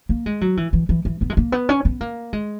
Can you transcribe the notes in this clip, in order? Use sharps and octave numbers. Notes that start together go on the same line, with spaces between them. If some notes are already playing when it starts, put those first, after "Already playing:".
A#3
G#3
F#3
E3
E3
E3
E3
B3
G#3
A#3
B3
C#4
B3
A#3
G#3